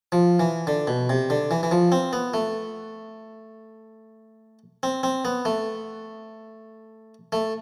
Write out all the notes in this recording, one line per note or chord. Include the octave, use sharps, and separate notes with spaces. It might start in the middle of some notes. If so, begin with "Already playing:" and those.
F3
E3
D3
B2
C3
D3
E3
E3
F3
C4
B3
A3
C4
C4
B3
A3
A3